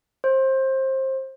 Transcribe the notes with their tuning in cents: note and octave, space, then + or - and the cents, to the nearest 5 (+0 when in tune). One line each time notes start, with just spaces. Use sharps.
C5 +25